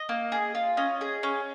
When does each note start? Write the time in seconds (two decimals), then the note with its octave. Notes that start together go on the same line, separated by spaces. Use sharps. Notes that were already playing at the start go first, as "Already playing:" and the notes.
Already playing: D#5
0.09 A#3
0.32 G#4
0.55 F4
0.77 C#4 D#5
1.01 G#4
1.23 C#4